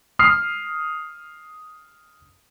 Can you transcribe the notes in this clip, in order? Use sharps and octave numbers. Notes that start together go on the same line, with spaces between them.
D#6 F6 C7